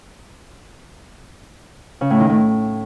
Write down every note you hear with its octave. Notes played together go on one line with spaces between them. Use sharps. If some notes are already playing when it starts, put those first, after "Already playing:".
C#3
A2
D#3
A2